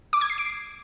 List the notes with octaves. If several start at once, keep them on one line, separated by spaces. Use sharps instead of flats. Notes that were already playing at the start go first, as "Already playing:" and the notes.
D6
G#6
C7
D7